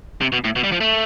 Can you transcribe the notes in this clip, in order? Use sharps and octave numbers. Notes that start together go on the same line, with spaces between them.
C3
B2
A2
B2
G3
F3
A3